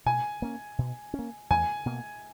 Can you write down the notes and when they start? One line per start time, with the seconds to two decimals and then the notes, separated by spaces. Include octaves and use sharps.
0.06 B2 G#5
0.42 A#3 C#4
0.78 B2
1.14 C#4
1.19 A#3
1.50 E2 G#5
1.86 B2 A#3